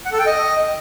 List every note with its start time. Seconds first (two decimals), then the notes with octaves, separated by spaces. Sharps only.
0.05 F#5
0.12 A4
0.19 G5
0.26 D#5